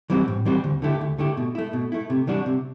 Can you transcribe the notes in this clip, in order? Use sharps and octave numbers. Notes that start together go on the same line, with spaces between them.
E3 G3 C4 F#4
A2
E3 G3 C4 F#4
D2
D3 A3 E4 G4
D2
D3 A3 E4 G4
B2
A3 E4
B2
A3 E4
C3
E3 G3 D4 F#4
C3